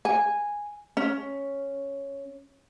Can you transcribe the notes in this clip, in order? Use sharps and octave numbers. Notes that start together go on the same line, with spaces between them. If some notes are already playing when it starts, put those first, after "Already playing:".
G#5
C#4